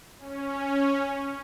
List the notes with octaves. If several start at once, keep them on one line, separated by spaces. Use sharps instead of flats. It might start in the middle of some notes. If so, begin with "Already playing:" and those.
C#4